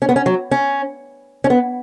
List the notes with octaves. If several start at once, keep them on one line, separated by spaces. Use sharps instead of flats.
C#4
B3
C#4
F#3
C#4
C#4
B3